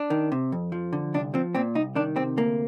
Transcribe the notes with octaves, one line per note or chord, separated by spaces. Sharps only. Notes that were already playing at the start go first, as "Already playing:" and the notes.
Already playing: D4
D#3
C3
F2
F3
D3
C2 D4
F3 C4
A#2 C4
C2 D#4
D#3 D4
C3 C4
D2 A#3